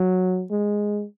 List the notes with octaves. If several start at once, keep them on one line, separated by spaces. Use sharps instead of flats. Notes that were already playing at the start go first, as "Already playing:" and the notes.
Already playing: F#3
G#3